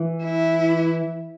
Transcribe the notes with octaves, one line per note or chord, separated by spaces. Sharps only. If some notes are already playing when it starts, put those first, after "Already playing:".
Already playing: E3
E4